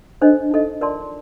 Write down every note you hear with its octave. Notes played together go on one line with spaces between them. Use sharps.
D4 A4 C5 D#5
D#4 A4 D#5
F4 A#4 D5 A5 C6